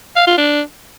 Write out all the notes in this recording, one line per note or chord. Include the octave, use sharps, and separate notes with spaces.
F5
F4
D4